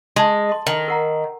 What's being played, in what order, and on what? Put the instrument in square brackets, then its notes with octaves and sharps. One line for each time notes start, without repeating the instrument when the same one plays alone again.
[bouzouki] G#3 [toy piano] D#5 A5
[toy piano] D#5 C6
[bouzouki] D#3
[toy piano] A#4 F#5 A#5